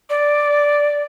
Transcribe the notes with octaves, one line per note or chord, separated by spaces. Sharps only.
D5